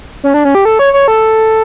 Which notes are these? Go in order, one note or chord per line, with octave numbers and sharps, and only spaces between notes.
C#4
D4
C#4
G4
A4
C#5
C#5
A4